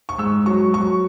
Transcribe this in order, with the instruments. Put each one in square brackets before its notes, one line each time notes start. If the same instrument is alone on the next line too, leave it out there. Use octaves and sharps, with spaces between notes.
[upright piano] C#6
G#2 E6
F#3 C#6
F#3 C#6